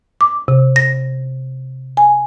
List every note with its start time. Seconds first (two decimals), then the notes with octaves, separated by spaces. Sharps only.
0.21 D6
0.48 C3
0.76 A#6
1.97 G#5